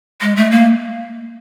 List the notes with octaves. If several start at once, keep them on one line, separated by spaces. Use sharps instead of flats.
G#3
A3
A#3